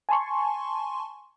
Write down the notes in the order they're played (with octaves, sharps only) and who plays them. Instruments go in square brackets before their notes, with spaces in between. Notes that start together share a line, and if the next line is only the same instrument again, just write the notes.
[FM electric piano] G#5 A5 C6 C#6